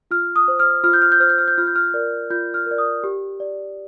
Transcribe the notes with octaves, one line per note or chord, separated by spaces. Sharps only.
F4 F6
D#6
C5
F6
F4 F6
G6
F6
G6
C5 F6
G6
F6
G6
F4 F6
G6
F6
A#4 D5
F4 G6
F6
A#4
D5
D#6
G4
D5